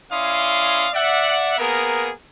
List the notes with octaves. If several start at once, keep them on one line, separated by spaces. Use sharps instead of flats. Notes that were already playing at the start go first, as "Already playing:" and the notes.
C#4 E4 D5 F5 C6 D#6
D5 E5 F#5
A#3 B3 G#4 A#4